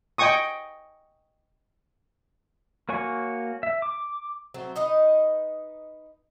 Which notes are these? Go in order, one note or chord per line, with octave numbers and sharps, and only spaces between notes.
D#5 G5 G#5 C#6 D#6
A#3 F#4 C#5 G#5 C#6
E5
D6
F#3 A3 C4 C5
D#4 B4 D#5